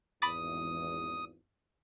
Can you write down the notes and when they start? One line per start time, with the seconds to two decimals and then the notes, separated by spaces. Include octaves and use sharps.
0.22 G#1 E2 B5 D6 D#6 A6